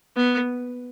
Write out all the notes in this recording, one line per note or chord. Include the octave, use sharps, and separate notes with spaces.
B3